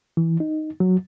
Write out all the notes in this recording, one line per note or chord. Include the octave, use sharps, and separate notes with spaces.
E3
D#4
F#3